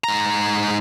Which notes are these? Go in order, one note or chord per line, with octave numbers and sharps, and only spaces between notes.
G#2 A#5